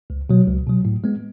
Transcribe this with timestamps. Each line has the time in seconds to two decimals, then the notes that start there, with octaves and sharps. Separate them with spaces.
0.10 C#2
0.30 B2 F#3
0.47 C#2
0.67 B2 F#3
0.85 A2
1.04 G#3 B3